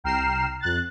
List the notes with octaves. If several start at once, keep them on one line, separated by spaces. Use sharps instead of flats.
C2 G5 A#5 F6 C7 E7
F2 F#6 A6